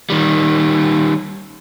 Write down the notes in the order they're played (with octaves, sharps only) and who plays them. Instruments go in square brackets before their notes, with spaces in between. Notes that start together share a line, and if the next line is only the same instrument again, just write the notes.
[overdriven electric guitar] D#3 G3